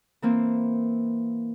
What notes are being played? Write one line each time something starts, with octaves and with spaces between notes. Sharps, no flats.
E3 A#3 C4